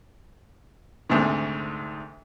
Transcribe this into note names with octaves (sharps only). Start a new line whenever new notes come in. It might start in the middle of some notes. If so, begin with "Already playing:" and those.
D2 G#2 C3 D#3